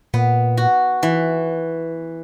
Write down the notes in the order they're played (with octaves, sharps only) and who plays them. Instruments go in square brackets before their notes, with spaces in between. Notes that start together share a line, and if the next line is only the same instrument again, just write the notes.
[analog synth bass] A#2 [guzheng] B3
[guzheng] F#4
E3